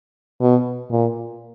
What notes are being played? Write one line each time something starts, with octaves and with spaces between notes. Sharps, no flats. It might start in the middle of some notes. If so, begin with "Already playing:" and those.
B2
A#2